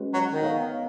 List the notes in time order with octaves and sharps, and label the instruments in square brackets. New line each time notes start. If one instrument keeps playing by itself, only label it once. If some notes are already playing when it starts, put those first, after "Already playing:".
Already playing: [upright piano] G#3 C#4 F#4 B4
[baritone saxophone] F#3
D#3
[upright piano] B3 D#4 A#4 C#5 F5